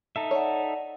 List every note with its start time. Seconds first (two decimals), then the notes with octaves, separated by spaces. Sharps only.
0.16 D#4 A4 E5
0.31 C#5 D5 F#5